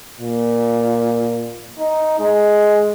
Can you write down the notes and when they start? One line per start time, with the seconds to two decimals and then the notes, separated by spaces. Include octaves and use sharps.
0.19 A#2
1.79 D#4
2.19 G#3